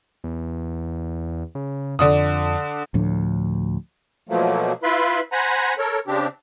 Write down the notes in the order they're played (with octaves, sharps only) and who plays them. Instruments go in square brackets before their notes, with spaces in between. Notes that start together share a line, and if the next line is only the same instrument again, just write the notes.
[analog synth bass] E2
C#3
[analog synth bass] F2 [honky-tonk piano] D3 D4 D#6
[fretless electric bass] D2 A2 F3 D4
[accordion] B2 F3 F#3 A3 A#3
E4 F4 B4 E5 B5 C6
C5 F#5 G#5 A#5 B5
A4 A#4 C#5
C#3 C4 D4 G4